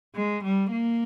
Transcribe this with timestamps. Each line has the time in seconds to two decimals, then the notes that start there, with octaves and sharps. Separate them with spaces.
0.15 G#3
0.43 G3
0.71 A#3